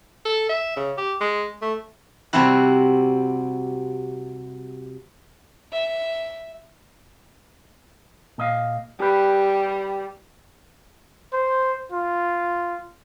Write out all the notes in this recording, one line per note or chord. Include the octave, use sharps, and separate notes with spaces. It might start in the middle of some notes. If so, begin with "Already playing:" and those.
A4
E5
C#3
G4
G#3
A3
C3 G3 C4 E4 F#4
E5
A#2 D#5 F5
G3 G4 B4
C5
F4